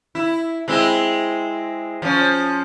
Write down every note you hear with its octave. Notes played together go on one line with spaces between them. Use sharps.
E4
G#3 C4 E4
F3 C#4